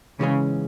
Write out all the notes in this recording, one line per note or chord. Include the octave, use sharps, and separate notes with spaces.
G#2 C#3 E3 G#3 C#4